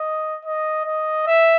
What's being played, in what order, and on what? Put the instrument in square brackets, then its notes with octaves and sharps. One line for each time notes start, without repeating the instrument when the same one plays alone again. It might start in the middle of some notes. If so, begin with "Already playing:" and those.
Already playing: [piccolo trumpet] D#5
D#5
D#5
E5